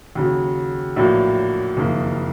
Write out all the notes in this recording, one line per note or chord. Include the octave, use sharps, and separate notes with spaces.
D#2 C#3 F#3
A#1 A2 F#3 A#3
F#1 F2 D#3 A#3